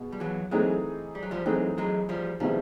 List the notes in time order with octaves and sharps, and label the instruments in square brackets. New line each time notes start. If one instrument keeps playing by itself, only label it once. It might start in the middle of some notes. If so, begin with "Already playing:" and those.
Already playing: [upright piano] B2 G#3
[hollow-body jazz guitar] G3
E3 F#3
[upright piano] E3 A3 C4 D#4 G#4 [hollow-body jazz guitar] F#3 G#3
[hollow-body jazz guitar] G3
F#3
F3 G3
[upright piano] E3 A3 C4 D#4 G#4 [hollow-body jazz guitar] F#3 G#3
[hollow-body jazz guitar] F#3 G#3
F3 G3
[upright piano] C3 D#3 G#3 B3 E4 [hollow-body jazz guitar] F3 G3